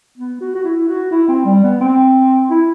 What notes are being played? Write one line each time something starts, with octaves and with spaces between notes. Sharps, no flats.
B3
F#4
F#4
E4
F#4
E4
C4
G3
B3
C4
E4